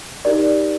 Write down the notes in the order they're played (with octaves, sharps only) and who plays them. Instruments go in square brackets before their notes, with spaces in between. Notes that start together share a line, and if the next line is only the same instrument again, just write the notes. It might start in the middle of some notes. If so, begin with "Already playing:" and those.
[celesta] D#4 G4 A#4 D5